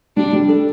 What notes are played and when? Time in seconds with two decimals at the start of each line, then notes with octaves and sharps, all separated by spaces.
0.17 G3 D4
0.33 G3
0.48 A4